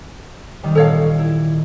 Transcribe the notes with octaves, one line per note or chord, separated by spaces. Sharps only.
D#3 G3
A#2 A4 C#5 F5
E4